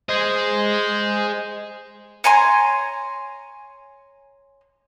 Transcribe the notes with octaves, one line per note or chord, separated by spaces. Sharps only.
G#4 C5 D#5
C#5 G#5 A#5 C6